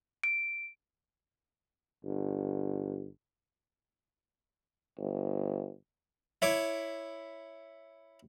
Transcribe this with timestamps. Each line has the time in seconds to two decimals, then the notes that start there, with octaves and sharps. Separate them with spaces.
0.24 D7
2.04 G1
4.98 G1
6.42 E4 C#5 D6